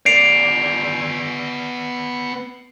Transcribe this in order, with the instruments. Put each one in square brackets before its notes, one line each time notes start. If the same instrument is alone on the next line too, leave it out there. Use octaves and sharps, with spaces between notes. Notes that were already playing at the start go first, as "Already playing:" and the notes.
[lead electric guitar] B3 D5 [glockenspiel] C7 D7 F7